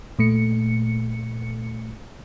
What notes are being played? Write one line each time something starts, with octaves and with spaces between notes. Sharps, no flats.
A#2 A3 C#7